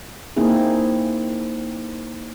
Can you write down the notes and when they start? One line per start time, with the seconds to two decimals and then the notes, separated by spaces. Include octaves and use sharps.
0.36 A#3 C4 D#4 E4 G#4